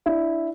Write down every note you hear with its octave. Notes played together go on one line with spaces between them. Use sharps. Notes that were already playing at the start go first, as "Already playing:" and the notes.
D4 E4